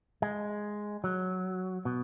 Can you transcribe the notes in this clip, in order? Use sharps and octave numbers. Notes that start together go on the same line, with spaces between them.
G#3
F#3
B2